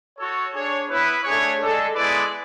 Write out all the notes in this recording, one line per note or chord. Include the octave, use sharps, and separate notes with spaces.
F#4 A4 C#5
D4 G#4 C#5
B3 E4 B4
A3 D4 G#4 C#5
G#3 D4 A4
G#3 B3 E4 B4 D5